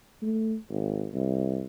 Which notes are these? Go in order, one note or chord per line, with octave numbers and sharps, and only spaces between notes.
A3
G#1
C2